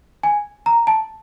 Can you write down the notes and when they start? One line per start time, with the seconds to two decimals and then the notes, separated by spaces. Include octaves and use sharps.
0.23 G#5
0.66 A#5
0.87 A5